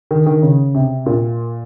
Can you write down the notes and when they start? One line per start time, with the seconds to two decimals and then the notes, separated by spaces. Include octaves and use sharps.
0.11 D#3
0.26 D#3
0.42 C#3
0.75 C3
1.06 A#2